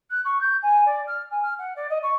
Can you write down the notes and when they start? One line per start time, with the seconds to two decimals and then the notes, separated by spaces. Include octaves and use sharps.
0.10 F#6
0.25 C#6
0.41 G6
0.62 G#5
0.86 D5
1.07 F6
1.31 G#5
1.42 F6
1.59 F#5
1.76 D5
1.90 D#5
2.03 C#6